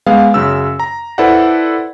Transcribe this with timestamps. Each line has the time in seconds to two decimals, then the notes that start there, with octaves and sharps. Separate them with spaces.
0.07 G#3 B3 F5
0.34 F#2 C#3 E6
0.80 A#5
1.18 E4 A4 B4 C5 D5 F#5